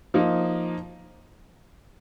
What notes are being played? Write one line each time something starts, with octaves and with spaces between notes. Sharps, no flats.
F3 A#3 D#4